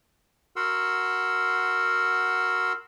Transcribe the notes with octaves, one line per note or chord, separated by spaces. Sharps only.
F#4 A#4 F#5 C6 E6